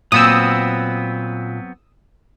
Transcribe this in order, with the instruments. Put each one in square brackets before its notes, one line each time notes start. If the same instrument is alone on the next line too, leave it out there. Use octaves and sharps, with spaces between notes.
[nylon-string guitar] A#2 [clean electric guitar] F#3 B3 C4 [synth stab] D#6 E6